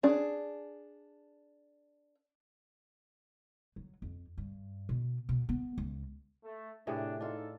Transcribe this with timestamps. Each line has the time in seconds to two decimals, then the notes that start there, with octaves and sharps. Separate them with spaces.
0.03 D4 G#4
3.76 F#3
4.02 F2
4.38 G2
4.89 B2
5.29 B2
5.49 B3
5.78 C#2
6.43 A3
6.87 A2 C3 D4 G#4
7.20 D4 D#4 F4 A4